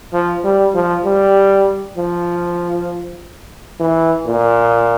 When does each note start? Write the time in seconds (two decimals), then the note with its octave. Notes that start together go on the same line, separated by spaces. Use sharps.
0.13 F3
0.44 G3
0.74 F3
1.05 G3
1.97 F3
3.80 E3
4.26 A#2